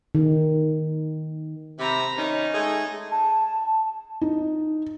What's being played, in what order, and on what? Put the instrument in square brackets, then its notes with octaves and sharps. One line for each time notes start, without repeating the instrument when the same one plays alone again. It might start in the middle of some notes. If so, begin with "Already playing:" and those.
[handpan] D#3
[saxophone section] C3 [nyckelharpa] A#5 B5
[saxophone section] D#3 C#4 [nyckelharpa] D#4
[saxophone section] G#3 A3 G#4
[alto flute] A5
[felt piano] D#4